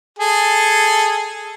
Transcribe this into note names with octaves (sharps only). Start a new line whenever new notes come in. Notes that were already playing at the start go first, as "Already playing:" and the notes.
G#4 A4